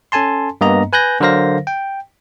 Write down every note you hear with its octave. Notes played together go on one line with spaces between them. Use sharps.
C#4 A4 G#5 A5 C6
G2 A#3 B3 D#5 A#5
B4 G#5 F#6 G6 A#6
D3 F#3 A#4 C5 F5 A#6
G5